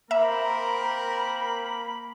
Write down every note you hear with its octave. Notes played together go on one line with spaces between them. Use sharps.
A#3 C4 A#4 E5 B5